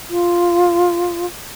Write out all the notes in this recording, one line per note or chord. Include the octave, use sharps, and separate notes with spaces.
F4